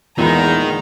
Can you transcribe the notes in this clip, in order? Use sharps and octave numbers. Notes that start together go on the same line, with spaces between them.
E2 A#2 D#3 G#3 B3 A#5